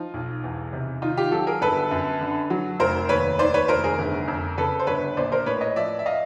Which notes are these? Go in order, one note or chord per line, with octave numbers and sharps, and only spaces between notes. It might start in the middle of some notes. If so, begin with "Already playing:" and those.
Already playing: F3 D#4 F4
B1
E2
C3
D#3 D#4 F4
F4 G4
F#3 G4 A4
G#4 A#4
G1 A4 B4
F#2
D3
F#3
F1 A#4 C5
D#2 B4 C#5
D#3 C5 D5
B4 C#5
F1 A#4 C5
G#4 A#4
G1
F2
C#3 A4 B4
C5
G1 B4 C#5
A#1 C5 D5
A#4 C5
A2 B4 C#5
C#5 D#5
F3 D5 E5
E5
D#5 F5